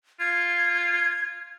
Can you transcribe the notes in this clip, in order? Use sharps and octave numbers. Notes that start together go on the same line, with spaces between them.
F4 G#6